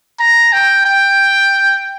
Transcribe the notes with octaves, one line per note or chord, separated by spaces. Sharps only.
A#5
G5
G5